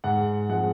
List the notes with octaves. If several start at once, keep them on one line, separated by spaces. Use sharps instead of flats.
G#2 F#5
F3 G#3 C4 F#5